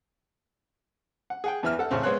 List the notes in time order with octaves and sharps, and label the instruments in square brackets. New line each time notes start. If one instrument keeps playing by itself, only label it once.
[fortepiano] F#5
G#4 F#5 G5
E2 E3 E5 F6
A4 F#5
A1 C#3 C4
G#3 B3 C5 C#5 C6 F#6